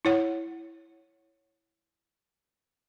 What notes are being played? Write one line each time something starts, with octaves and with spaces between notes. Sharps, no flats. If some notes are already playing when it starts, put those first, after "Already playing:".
E4 C#5 F#5